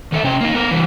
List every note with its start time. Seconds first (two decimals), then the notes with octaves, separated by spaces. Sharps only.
0.12 D#3 A4 E5
0.23 C3 C#4 G5
0.41 A#3 D#4
0.54 B3 A#4
0.71 E3 G3